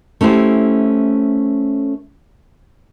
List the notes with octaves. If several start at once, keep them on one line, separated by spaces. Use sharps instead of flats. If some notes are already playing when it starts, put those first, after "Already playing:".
A3 C#4 E4 G4 C5